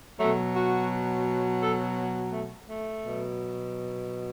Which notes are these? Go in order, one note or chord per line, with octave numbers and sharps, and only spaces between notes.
B2 F#3 A3
F#4
A4
A3
A3
B2 F#3